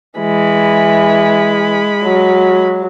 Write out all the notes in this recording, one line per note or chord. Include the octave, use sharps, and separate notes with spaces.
E3 G#3 B5
F#3